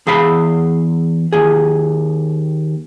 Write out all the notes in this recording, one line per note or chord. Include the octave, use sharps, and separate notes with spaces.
E2 G#4 F5 B5
D#2 G#4